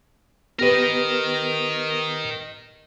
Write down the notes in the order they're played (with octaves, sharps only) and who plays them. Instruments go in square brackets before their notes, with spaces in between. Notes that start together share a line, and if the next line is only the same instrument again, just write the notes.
[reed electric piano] B3 G4 B4 [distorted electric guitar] A#4 D#5